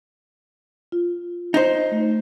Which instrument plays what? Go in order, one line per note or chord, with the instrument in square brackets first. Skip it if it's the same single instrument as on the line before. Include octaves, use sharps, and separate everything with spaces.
[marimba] F4
[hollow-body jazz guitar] D#4 C5
[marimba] A3